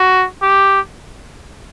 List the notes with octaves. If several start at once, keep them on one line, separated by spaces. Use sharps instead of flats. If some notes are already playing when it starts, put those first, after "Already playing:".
Already playing: F#4
G4